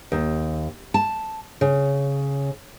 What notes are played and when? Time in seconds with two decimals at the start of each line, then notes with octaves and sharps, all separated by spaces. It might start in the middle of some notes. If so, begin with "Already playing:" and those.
0.12 D#2
0.94 A5
1.61 C#3